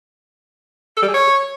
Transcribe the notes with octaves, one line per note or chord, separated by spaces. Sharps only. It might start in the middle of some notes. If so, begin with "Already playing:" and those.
A4
G3
G#4
C#5